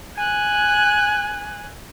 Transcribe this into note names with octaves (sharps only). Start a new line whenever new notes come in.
G#5 F#6